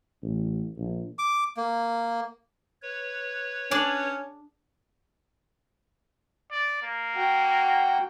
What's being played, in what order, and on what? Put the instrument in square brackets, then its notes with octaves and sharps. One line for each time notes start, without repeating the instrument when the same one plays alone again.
[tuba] A1
A#1
[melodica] D6
A#3
[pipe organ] B4 C#5
[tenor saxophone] C#4 [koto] D4 G#4 D5
[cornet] D5
A#3
[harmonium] F#4 F#5 G5